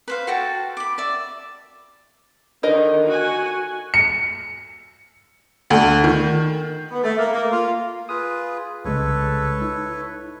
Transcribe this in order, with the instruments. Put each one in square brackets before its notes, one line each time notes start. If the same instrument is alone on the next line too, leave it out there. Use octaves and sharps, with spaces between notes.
[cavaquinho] B4 C5 F5
F#4 A4 G5 A5
B5 D6
D5 E5
[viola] D3 D#3 [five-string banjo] D#4 A#4 D#5
[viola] F#4 G#5
[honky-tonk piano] C#7
D2
D#3
[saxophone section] B3
A3
A#3
A#3
F4
[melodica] F4 G#4 B4 [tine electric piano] D#6
[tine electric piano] C2 C#3 G#3 [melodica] A4 B4 C#5
[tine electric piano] D#4 E4